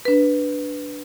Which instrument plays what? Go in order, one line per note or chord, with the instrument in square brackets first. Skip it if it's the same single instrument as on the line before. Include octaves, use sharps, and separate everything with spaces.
[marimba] D4 B4